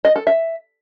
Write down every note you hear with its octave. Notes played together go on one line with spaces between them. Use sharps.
D#5
A4
E5